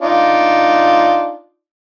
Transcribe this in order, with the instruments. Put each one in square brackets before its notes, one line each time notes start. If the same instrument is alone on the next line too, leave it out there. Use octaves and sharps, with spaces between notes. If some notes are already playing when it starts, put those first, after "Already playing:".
[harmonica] D4 D#4 F4